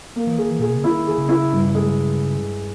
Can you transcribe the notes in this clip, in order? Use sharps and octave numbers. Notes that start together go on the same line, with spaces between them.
A#3
E3
D#3 G#4
E3
A#2 G#4
B2
C#3
D#3 E4
G#4
C#3
E4
G2
G#3